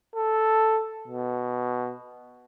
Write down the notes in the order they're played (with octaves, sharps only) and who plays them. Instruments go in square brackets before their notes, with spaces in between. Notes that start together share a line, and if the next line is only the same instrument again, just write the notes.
[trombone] A4
B2